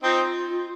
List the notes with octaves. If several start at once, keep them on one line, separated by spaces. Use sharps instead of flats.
C4 D#4 F4